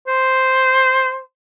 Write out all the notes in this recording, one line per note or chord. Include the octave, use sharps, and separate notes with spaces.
C5